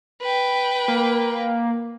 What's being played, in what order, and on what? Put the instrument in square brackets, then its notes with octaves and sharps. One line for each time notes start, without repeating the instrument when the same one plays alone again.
[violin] B4 G5
[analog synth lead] A#3